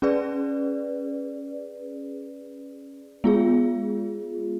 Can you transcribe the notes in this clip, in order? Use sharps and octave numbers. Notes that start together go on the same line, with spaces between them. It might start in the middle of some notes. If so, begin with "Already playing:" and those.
C#4 G#4 B4 D5
G#3 B3 F4 G#4